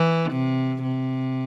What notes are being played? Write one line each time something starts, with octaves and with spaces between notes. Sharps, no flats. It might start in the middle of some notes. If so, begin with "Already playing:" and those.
Already playing: E3
C3
C3